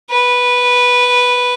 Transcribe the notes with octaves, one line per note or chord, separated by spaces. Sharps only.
B4